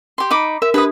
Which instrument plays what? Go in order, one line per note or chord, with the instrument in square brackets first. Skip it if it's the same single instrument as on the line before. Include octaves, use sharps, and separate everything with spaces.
[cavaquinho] G4 C6
D#4 B5 D6
[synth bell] A#4 [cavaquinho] E5
[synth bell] D4 G4 [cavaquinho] B4 A#5 D#6